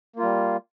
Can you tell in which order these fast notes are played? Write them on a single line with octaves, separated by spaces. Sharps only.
A#3 F4 G3